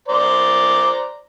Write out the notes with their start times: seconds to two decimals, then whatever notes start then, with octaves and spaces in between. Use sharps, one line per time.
0.08 C5 D5 A#5